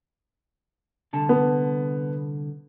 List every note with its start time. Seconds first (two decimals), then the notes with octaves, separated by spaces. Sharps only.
1.13 C2 D3 A5
1.29 B3